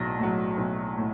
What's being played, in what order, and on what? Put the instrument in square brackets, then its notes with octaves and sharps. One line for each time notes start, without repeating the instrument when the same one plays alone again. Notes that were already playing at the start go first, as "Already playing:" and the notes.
Already playing: [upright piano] B1 A2 F#3 A6 A#6
A2 F#3
B1
A2